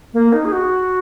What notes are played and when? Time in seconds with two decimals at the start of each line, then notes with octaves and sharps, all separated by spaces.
0.14 A#3
0.33 D#4
0.45 G#4
0.52 F#4